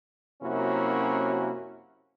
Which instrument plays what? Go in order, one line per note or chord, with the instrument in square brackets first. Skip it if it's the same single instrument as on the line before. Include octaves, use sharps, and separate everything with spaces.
[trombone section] F#2 C3 A#3 C#4 E4 F#4